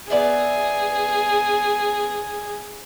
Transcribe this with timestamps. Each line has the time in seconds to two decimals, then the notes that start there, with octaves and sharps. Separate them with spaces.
0.10 B3 G#4 D5 E5